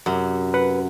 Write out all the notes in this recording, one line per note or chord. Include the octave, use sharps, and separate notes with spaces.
F#2 C3
B4 F#5